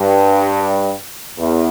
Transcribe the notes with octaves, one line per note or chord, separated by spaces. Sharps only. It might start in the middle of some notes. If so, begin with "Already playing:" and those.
Already playing: G2
E2